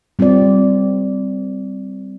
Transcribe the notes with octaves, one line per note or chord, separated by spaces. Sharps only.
G3 C4 F4 D5